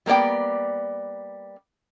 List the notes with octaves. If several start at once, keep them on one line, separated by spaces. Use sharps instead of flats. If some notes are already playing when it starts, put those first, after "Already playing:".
G3 A#3 B3 D5 G5